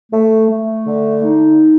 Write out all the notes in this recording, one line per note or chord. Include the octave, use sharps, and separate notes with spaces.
A3
A3
D3
D#4